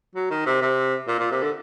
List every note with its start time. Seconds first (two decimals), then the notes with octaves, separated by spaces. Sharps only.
0.16 F#3
0.31 D#3
0.46 C3
0.62 C3
1.08 A#2
1.19 A#2
1.31 C3
1.42 D3